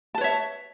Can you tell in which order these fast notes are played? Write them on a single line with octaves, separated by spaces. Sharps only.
A5 B4 C#5 E5